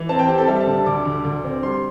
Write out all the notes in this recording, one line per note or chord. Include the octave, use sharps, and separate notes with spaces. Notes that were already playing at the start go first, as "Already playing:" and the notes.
Already playing: E3
C4 A5
G5
C4 G4
A4
G3 E5
A5
D3
A5
D2 D6
D3
D2
C4
G3 C6